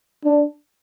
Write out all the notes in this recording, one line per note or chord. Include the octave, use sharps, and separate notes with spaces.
D4